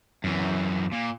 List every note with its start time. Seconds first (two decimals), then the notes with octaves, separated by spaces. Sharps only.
0.24 F#2 E3
0.92 A#2